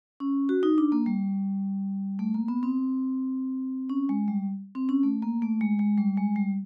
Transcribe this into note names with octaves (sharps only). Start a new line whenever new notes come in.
C#4
F#4
D#4
D4
A#3
G3
A3
A#3
B3
C4
C#4
G#3
G3
C4
C#4
A3
A#3
A3
G#3
G#3
G3
G#3
G3